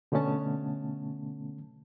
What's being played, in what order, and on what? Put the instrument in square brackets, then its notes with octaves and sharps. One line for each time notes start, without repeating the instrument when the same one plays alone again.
[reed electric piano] B2 D3 A3 B3 C#4 A5